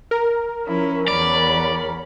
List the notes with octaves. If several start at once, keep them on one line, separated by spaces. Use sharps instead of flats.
A#4
F3 C#4 E4
E2 C#5 D5 B5